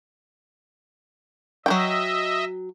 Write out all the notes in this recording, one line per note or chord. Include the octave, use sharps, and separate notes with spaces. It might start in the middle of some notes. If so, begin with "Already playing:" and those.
F#3 E4 D#5 E5 G5